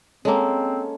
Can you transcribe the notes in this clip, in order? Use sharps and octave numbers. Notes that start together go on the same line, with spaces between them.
G#3 A#3 C4 C#4 A4